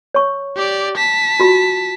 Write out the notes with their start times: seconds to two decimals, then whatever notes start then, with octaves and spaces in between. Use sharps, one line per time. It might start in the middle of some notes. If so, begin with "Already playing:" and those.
0.14 C#5 C#6
0.56 G4 D5
0.97 A5 B6
1.40 F4 F#4